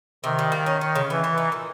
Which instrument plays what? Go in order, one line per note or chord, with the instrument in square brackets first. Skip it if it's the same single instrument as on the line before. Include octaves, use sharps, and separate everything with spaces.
[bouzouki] C3 [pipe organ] D#3
[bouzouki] G3
A#3
C#4
C#4
C#3
[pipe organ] E3 [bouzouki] B3
[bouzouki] B3
D#4
A#2